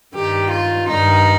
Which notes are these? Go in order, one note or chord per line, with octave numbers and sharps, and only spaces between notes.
G2 D#3 G4
F4
G2 D#3 D#4